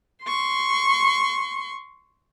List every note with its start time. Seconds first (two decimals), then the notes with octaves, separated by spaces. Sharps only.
0.24 C6 C#6